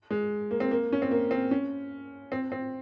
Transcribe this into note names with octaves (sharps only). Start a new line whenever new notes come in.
G#3
A#3
C4
A#3
C#4
C4
A#3
C4
C#4
C4
C4